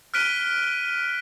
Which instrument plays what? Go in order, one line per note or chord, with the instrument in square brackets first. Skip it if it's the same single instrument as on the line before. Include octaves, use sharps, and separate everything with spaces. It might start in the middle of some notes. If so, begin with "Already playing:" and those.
[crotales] F6 F#6 B6 D7 D#7 G7